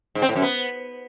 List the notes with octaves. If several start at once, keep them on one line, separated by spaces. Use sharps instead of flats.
G#2
C4
A2
F#2
B3